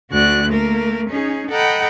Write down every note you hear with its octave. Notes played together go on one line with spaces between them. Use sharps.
D2 F#4 D5 F#6
A3 A#3 A#4
C#4 D#4 G#4
A4 D#5 F#5 G5 A#5 B5